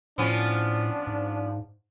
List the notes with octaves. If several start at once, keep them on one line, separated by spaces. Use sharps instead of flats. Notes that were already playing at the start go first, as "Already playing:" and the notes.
A2 F3 B3 C#4 D4
G#2